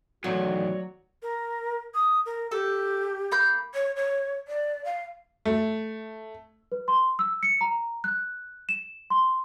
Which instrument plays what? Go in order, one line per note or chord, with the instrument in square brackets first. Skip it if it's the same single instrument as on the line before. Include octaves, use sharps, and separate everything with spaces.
[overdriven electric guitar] B1 E2 [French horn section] D#3 A3 D5 [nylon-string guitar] F#3 [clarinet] F#4
[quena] A#4
D#6
A#4
[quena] G4 [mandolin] A4
[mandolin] A#3 B5 G6
[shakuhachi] C#5
C#5
D5
F5
[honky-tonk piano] A3
[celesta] B4
C6
E6
C#7
A#5
F#6
E7
C6